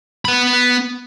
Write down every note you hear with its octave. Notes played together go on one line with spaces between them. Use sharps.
B3 B5